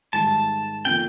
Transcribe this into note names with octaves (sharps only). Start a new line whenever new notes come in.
G#2 D#3 G3 A5
D3 F3 A#3 D4 G5